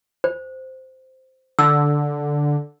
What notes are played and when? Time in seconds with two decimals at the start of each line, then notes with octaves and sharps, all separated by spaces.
0.24 C5
1.59 D3 E6